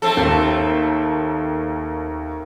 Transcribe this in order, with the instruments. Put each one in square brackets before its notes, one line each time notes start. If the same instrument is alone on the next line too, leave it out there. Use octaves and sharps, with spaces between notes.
[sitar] A3 C4 A4
[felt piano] D#2